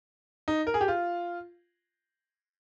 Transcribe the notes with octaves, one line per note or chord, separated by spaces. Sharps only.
D#4
A#4
G#4
G4
F4